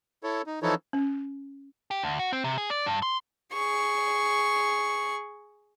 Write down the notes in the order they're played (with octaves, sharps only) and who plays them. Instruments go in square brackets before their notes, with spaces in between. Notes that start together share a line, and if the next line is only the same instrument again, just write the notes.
[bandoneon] E4 A4 C#5
D#4
E3 F3 D#4 E4 A4 C#5
[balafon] C#4
[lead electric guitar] G4
D2
F#4
C4
C3
G#4
D5
G2
C6
[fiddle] G#4 C#6